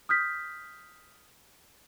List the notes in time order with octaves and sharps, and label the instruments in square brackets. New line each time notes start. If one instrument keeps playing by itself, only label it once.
[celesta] D#6 F6 G6 B6